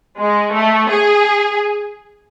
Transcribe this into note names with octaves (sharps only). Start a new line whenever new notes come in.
G#3
A3
G#4